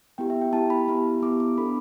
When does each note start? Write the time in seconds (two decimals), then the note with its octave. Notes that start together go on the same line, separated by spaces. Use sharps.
0.18 B3 E4 G4 G5
0.30 E5
0.41 G5
0.52 B3 E4 G4 A5
0.70 B5
0.88 B3 E4 G4
1.22 B3 E4 G4 D6
1.40 D6
1.58 B3 D4 A4 B5